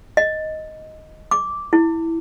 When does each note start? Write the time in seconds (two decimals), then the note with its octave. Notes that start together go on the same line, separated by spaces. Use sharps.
0.17 D#5
1.31 D6
1.73 E4